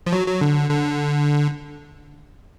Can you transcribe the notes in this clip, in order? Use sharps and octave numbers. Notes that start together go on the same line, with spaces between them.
F3
F#3
F#3
D3
D3